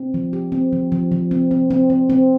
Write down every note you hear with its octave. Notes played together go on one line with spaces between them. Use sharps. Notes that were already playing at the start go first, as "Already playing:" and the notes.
Already playing: C4
F3
G4
C4
F3
F3
F3
C4
C4
C4
C4
C4